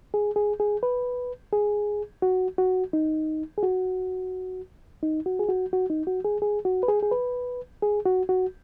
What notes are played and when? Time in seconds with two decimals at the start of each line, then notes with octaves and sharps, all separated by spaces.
0.14 G#4
0.36 G#4
0.60 G#4
0.83 B4
1.53 G#4
2.22 F#4
2.58 F#4
2.93 D#4
3.58 G#4
3.63 F#4
5.03 D#4
5.26 F#4
5.39 G#4
5.49 F#4
5.73 F#4
5.90 D#4
6.07 F#4
6.25 G#4
6.42 G#4
6.65 F#4
6.83 B4
6.88 G#4
7.03 G#4
7.11 B4
7.82 G#4
8.05 F#4
8.29 F#4